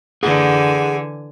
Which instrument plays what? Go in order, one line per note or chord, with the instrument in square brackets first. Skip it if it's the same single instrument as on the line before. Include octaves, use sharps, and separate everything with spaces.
[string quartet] D3 E3 G#5 [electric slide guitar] G#4 F#5